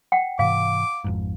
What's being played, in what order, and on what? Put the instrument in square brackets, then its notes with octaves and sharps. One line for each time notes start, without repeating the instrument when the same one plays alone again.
[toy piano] F#5 G5
[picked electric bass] G#2 C3 E3 [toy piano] F5 [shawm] D6
[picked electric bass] G#1 F2 G#2